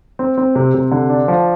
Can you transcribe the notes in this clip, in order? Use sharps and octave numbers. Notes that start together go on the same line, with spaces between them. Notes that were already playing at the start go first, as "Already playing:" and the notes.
C4
C4
C3
C3
D3
D4
F3